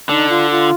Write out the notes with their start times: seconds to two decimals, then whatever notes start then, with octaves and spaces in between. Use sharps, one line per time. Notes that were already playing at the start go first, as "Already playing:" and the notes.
0.09 D3 D#4
0.29 F4
0.51 F4